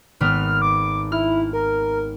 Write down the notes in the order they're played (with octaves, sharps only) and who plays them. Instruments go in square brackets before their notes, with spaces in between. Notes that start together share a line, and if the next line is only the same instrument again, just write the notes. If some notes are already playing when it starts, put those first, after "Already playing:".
[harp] G#1 B3 [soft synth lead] F6
[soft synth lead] D6
[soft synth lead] E4 [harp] F6
[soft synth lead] A#4